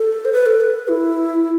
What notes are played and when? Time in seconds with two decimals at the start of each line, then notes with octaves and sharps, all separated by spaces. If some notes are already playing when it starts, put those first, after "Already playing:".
Already playing: A4
0.25 C5
0.33 B4
0.46 A4
0.60 B4
0.88 E4